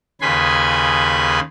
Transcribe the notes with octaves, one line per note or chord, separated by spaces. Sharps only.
D#2 C#3 B4 G#5 B5 C6